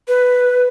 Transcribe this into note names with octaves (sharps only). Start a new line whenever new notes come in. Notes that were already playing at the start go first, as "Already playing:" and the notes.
B4